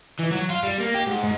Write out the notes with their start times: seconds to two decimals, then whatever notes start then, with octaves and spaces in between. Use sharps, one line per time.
0.19 E3
0.31 F#3
0.50 F4
0.63 G3
0.80 A#3
0.94 G4
1.07 G#2
1.24 G#2